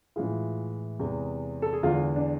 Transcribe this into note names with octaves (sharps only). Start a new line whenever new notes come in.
A2 E3 G#3 F4
E2 C3 G#3
A4
G#4
E2 D3 G#3 F4
D4